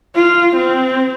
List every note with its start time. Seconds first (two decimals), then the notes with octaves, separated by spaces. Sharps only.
0.15 F4
0.56 C4